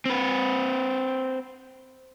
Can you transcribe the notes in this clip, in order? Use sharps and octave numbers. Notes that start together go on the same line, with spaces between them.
C4 B4